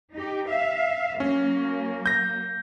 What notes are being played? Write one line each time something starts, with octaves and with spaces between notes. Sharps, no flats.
D#4 G4
E5 F5
F#3 A#3 C#4
G6 A#6